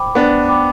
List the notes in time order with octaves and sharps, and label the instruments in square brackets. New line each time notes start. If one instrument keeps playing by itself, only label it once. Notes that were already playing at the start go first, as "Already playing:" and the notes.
Already playing: [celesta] C5 G5 B5 D6
[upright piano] B3 D4 [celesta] C5
[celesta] G5 B5 D6